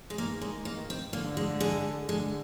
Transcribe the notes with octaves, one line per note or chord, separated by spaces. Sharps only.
G#3
D#3 A#3
G#3
A#3
C4
D3 A#3
G#3
G#3
D3 G#3